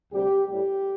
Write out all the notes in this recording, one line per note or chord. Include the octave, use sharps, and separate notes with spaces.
D2 C3 G3 G4
A2 G3 G4